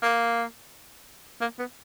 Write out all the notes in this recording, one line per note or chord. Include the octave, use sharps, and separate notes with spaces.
A#3
A#3
B3